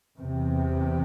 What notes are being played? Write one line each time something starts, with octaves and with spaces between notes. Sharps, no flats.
E2 C3